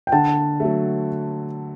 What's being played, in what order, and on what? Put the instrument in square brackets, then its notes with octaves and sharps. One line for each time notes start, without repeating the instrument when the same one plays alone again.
[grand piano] G5
[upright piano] D3 [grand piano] F#5 A5
[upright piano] F#3 A3